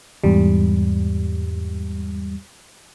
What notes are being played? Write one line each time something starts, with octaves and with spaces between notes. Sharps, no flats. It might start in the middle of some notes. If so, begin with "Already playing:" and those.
E2 G#2 G3